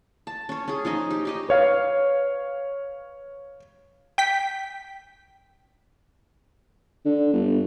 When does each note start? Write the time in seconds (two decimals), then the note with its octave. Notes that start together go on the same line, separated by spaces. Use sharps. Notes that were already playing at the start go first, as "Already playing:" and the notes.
0.27 A5
0.49 C#4 C#5
0.68 C#4 G#4
0.85 F3 C#4 D#4 D#5
1.10 G4
1.25 D#4 G4 D#5
1.49 B4 C#5 F5
4.18 G5 B6
7.05 D3
7.34 G1